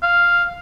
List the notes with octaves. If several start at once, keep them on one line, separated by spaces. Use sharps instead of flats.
F5